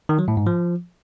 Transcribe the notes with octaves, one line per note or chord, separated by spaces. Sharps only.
D#3
F#3
A2
G#2
F3